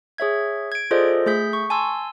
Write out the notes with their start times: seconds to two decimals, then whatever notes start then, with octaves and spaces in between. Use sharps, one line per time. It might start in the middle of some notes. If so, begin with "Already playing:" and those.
0.18 G#4 C#5 E5 G#6
0.72 G#6 D7
0.91 F4 G#4 A4 C5 D5 D#5
1.26 A3 G#4 G6 B6
1.53 C#6
1.70 G#5 A5 C6 E6